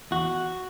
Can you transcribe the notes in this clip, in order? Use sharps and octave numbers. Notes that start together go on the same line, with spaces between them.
E2 F#4